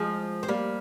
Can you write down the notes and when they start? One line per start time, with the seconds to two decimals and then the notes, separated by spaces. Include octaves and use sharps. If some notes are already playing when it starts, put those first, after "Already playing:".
Already playing: F3 G#3
0.43 C4
0.48 G3 A#3